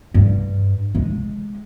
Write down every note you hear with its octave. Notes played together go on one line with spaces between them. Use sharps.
G2
G#3